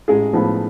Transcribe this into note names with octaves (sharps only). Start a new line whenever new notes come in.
A1 G#3 G#4
A2 F3 G#3 B3